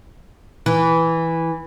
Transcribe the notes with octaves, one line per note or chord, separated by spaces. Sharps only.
E3